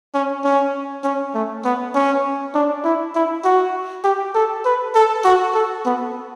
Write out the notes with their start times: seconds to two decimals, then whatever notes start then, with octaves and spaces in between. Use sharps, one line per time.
0.14 C#4
0.44 C#4
1.04 C#4
1.34 A3
1.64 B3
1.94 C#4
2.54 D4
2.84 E4
3.15 E4
3.44 F#4
4.04 G4
4.34 A4
4.65 B4
4.95 A4
5.24 F#4
5.54 A4
5.85 B3